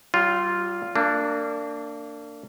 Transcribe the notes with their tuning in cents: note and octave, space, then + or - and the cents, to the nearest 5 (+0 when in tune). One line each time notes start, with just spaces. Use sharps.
G3 -40 F4 +0
A#3 -35 D4 +0